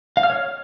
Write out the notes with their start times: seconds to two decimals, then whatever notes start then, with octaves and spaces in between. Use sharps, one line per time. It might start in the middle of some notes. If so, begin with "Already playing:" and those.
0.17 F5
0.23 F6
0.30 C#5